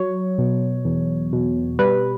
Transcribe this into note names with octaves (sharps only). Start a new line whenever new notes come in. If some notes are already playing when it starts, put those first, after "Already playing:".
Already playing: F#3 C#5
B2
E2
B2
G3 B4